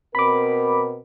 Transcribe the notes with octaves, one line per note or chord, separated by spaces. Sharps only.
B2 C4 A#4 B5 D6